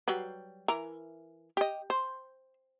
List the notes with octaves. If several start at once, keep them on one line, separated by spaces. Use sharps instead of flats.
F#3 G3 B4
E3 A#4 A#5
G4 D#5
C5